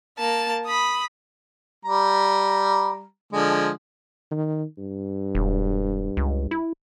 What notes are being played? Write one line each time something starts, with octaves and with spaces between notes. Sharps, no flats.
A#3 A5
B5 D#6
G3 A#5
D3 F3 G#3
D#3
G2
E1
C#2
E4